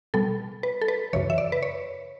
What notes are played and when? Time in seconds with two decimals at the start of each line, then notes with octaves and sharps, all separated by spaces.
0.14 B2 G3 B3 A4
0.63 B4
0.81 A4
0.88 B4
1.13 F#2 C#3 E3 C#5
1.30 E5
1.38 D5
1.52 B4
1.63 C#5